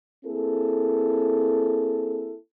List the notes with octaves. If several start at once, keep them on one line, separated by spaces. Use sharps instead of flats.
A#3 C4 E4 G#4 A4